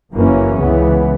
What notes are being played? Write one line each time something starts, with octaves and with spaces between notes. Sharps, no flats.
F#1 F#2 E3 A#3 C#4
C#2 C#3 E3 B3